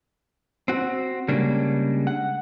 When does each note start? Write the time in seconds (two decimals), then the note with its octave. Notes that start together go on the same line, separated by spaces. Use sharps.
0.68 C4 F#4
1.28 C#3 G3 G#3 A#3 D4
2.07 F#5